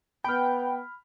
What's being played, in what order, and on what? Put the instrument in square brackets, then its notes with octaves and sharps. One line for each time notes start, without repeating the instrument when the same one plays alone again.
[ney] B3 [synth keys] G5 [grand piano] B5 F6